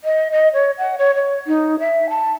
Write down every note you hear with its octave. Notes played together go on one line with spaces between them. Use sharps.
D#5
D#5
C#5
F#5
C#5
C#5
D#4
E5
A5